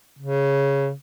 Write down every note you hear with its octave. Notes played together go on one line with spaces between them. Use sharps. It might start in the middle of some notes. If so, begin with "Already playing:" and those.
C#3